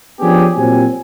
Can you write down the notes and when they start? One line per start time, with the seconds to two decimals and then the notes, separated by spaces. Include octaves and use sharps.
0.20 F3 B3 C#4 D4 G4 G#4
0.55 A#2 F#3 C4 G4 G#5